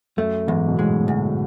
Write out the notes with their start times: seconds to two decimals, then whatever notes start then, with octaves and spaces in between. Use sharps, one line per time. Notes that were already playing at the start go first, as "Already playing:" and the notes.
0.17 F#2 A3
0.47 E2 G#2
0.68 B2
0.78 A2 G#3
1.08 D2